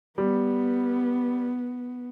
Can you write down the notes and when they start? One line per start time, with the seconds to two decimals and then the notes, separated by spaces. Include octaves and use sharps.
0.18 G3 B3